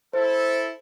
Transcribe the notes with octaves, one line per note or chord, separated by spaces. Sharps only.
E4 A4 C5